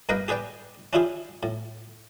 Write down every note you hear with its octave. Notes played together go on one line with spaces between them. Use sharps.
G2 A#3 A#4 B4 D#5 G5
G4 G#4 B4 D5 G5
C#4 D4 E4 F4 G4 G#4
A2